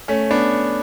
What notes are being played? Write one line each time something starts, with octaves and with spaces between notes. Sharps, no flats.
A3 C#4
B3 D4